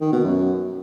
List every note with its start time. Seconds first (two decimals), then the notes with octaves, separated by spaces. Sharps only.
0.01 D#3
0.12 B2
0.24 F#2